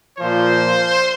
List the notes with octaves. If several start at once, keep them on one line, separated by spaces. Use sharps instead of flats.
A#2 F3 C5